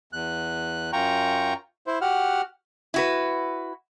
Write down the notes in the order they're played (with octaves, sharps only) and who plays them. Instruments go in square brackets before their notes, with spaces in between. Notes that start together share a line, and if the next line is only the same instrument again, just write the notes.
[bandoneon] E2 F#6
F#2 F4 G5 A#5 C#6
E4 C5
F#4 G4 F#5 F6
[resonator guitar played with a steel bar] E4 F#4 B4